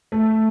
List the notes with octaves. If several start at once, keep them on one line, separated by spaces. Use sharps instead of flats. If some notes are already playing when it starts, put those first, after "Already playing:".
A3